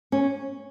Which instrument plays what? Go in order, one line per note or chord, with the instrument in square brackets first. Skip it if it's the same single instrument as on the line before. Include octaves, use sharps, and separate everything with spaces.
[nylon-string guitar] C#4